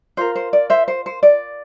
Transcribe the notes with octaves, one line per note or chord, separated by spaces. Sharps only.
F4 A#4 C5
C5
D5
C5 E5
C5
C5
D5